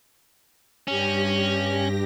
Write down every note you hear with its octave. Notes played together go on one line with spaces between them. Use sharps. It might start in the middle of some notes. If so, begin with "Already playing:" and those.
G2 C#4 G4 A#6